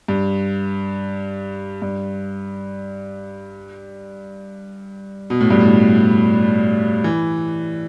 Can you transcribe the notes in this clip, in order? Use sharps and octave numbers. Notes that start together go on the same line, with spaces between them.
G2
G2
B2
A2
G2
A2
E3